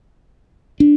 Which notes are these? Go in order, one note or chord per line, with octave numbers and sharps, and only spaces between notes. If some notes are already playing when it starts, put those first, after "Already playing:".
D4